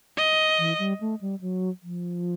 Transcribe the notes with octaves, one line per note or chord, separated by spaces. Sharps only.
D#5
E3
G3
A3
G3
F#3
F3